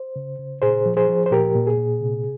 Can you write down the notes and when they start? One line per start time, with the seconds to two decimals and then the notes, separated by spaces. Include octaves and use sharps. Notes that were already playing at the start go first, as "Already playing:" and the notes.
Already playing: C5
0.16 C#3
0.39 C#3
0.62 A#2 G#4 C5
0.86 F3
0.97 G#4 C5
1.09 F3
1.26 C5
1.31 A#2 G4 A#4
1.55 A#2
1.67 G#4
1.78 A#2
2.01 C3